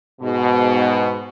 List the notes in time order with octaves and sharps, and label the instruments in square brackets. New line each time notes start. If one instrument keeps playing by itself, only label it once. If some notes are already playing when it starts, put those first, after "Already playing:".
[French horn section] G#2 B2